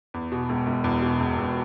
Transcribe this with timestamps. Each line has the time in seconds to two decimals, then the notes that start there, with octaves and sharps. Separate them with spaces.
0.14 E2
0.32 B2
0.49 E1
0.67 E1
0.84 E2
1.02 B2
1.20 E1
1.38 E1